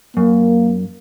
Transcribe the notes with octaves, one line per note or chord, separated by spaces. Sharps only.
F#2 A#3